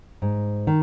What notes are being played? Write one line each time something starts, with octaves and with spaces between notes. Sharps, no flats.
G#2
D#3